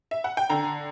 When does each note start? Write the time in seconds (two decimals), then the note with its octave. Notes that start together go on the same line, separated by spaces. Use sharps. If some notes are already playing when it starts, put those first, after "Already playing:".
0.11 E5
0.24 F#5
0.37 G5
0.50 D3 A#5